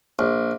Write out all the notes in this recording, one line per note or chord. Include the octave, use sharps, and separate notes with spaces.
A#1